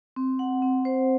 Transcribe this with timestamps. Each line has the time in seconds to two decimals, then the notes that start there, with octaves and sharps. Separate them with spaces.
0.16 C4
0.39 F#5
0.62 C4
0.85 C5